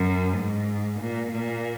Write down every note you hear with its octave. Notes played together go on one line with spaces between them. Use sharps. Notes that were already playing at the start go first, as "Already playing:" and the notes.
Already playing: F#2
G#2
A#2
A#2